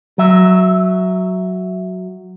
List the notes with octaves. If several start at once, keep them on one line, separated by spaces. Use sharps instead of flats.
F#3 E5